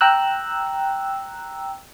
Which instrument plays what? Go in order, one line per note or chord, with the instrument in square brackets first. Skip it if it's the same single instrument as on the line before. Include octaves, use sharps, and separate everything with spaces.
[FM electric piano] G5 A#5 E6 F#6